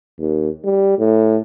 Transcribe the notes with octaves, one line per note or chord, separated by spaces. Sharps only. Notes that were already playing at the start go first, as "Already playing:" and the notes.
D#2
G3
A2